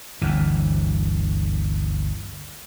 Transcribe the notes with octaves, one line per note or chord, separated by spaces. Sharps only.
G1 D2 E3